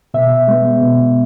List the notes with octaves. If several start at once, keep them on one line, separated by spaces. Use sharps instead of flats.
B2 E5
G#3 B3
B2